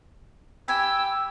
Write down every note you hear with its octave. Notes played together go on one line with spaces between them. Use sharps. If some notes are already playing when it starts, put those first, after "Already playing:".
G4 G5 G#5 B5 E6